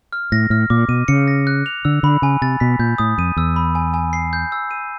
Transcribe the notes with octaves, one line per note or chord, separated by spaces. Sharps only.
F6
A2 A#6
A2 F6
A#2 D6
B2 D#7
C#3 C#7
A#6
F#6
F7
D3 E6
D3 B5
C#3 G#5
C3 A6
B2 B6
A#2 G6
A2 D#6
F2 D#7
E2 E6
B5
G#5
G#5
C7
G6
E6
D#7